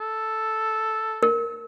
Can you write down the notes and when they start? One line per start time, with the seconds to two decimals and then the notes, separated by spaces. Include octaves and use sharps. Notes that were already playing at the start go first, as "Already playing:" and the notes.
0.01 A4
1.23 A#4